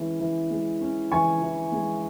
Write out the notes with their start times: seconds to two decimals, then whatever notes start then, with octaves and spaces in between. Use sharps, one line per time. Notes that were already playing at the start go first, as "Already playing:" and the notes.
Already playing: E3 G#3 C#4
0.20 E3
0.51 G#3
0.81 C#4
1.12 E3 G#5 C#6
1.42 E3
1.72 G#3